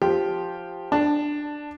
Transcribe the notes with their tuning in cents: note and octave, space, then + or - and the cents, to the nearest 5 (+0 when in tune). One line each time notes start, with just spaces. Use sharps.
F3 +0 G4 +0
D4 +10 A5 +0